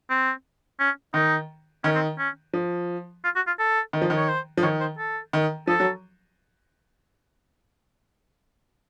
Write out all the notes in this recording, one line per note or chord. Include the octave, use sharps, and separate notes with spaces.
C4
C#4
D#3 D#4
D#3 C#4
C4
C#4
F3
F4
F#4
F4
A4
D#3
F3
D#3
C#5
C5
F3
D#3 C#5
C5
A4
D#3
F3 A4
F#3